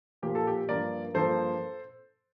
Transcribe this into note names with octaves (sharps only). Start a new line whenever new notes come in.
A#2 F3 A#3 G4
A4
G4
G2 F3 A#3 A#4 D5
G2 F3 A#3 A4 C5